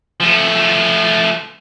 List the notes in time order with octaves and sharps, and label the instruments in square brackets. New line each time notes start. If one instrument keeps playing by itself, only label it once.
[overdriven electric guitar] F3 A3